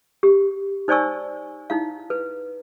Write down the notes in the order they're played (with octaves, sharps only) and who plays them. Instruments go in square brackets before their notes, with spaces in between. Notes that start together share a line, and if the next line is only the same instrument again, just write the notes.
[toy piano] G4
D#4 C5 D5 G#5 C#6 E6
D#4 E4 F5
B4